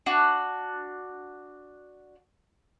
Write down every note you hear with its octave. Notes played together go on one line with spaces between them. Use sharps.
D4 F#4